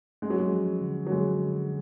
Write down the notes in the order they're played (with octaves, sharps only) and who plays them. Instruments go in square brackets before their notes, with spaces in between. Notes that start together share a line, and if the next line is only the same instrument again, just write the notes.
[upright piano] G#3 [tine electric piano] C#4
[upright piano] F#3
G#3
[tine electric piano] F3
D3
[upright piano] F#3
[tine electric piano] D3 [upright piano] G#3
[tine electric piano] D3